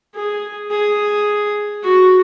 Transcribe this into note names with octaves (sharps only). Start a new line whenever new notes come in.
G#4
G#4
F#4